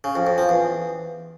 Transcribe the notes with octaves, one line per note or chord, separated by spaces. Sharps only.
C#3
F2
F2
F3
E2